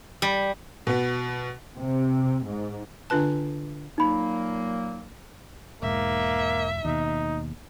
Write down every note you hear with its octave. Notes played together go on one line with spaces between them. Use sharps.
G3
B2 B3
C3
G#2
D3 D4 F4 B4 A5
A#2 F#3 A#3 D#4 B5
E1 G#2 A#3 E5
D#2 B2 D#4